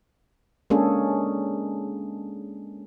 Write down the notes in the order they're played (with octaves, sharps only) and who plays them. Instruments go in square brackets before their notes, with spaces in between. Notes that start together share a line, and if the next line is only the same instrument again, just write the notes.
[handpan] G#3 A#3 C#4 D4 G#4 A4